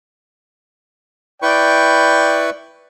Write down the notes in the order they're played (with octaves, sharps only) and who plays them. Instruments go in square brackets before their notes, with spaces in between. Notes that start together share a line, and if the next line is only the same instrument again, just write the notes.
[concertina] E4 B4 C#6 [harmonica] D5 G5